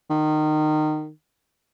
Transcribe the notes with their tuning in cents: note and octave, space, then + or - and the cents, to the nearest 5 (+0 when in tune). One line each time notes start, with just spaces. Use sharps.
D#3 -20